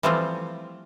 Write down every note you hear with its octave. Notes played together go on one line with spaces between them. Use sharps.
E3 F3 G3 A3 C4 F4